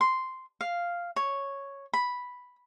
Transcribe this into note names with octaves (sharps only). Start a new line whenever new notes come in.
C6
F5
C#5
B5